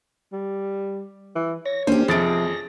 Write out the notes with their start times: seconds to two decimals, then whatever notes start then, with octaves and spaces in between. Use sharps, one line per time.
0.32 G3
1.35 E3
1.66 C#5 A#6
1.87 A#3 C#4 D4 G4 C5
2.08 F2 C3 F3 G#4 A6 A#6 D7